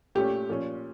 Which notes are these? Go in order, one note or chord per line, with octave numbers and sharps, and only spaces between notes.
A#2 A3 C#4 G4
A#2 F3 C#4